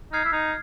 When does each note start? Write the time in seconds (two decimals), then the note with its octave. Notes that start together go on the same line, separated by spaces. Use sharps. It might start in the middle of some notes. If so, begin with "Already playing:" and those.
0.12 D#4 F6 G#6 C7
0.25 E4
0.32 D#4